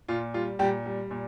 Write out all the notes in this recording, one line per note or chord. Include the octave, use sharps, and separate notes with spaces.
A#2 F4
G3 F4
A#2 G3 G4
G3
A#2